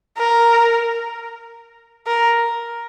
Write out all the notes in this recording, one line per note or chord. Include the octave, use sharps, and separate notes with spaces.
A#4
A#4